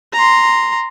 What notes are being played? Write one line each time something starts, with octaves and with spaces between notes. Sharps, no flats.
A#5 C6